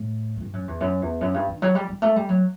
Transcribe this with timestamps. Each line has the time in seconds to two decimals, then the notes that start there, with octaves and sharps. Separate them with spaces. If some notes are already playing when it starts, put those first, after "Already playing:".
Already playing: A2
0.37 F#2
0.41 G2
0.53 F#2
0.68 E2
0.81 F#2
1.02 E2
1.21 F#2
1.34 G2
1.48 D#3
1.62 F#3
1.75 G3
1.89 G3
2.02 A3
2.16 G3
2.29 F#3